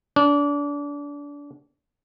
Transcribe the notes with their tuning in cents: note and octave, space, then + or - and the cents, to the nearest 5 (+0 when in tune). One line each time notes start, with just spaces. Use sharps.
D4 -30